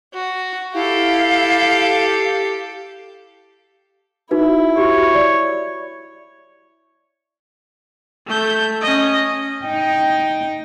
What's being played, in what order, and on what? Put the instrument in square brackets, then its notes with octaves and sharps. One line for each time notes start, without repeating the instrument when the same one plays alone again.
[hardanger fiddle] F#4
[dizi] E4 [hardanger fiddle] G4 A4 [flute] F5
[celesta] D#4 F#4 B4 [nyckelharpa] E4
[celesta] F#4 G4 [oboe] C#5
[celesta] D5
[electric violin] A3 G6
C#4 D#5
[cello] D#4 G5